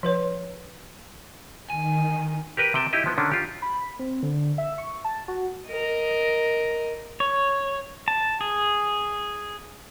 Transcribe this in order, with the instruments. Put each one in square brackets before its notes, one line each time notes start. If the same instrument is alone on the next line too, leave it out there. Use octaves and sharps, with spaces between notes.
[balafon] F3 B4 C#5
[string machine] D#3 [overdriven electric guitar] G#5
[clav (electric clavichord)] G4 A#4 B4 G5
C3 G5 A5
D#4 E4 G4 D#5
F3 B3
D3 D#3 C#4 D4
F4 G4
[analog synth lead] B5
C4
D3
E5
C#6
A5
F#4
[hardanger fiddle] A#4 D#5
[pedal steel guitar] C#5
A5
G#4